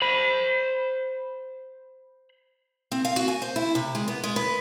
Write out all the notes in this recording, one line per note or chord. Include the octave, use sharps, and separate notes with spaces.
C5 B5
C4
F5
F#4
G#5
C5
E4
C3
G#3
B3
G#3
B4